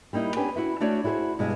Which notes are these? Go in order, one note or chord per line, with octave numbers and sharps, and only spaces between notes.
G3 A#3 D#4 E4
B3 C#4 D4 G4 B4 G#5
E4 F#4 E5
A3 D4 F#4 C#5 D5
E4 F#4 G#4 B4 C5
G2 B2 G#3